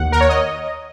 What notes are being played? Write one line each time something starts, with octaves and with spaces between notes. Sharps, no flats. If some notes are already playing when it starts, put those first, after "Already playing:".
Already playing: D#2 F#5
A#4
C#5
D#5